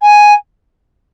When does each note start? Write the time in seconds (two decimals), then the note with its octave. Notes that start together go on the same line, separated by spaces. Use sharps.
0.01 G#5